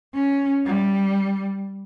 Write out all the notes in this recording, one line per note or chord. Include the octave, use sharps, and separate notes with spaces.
C#4
G3